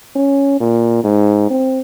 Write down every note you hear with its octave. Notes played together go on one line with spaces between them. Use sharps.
C#4
A#2
G#2
C4